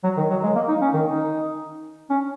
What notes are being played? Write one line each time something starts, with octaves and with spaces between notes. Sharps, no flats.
F#3
D#3
F#3
G#3
A#3
D#4
C#4
D#3
D#4
C#4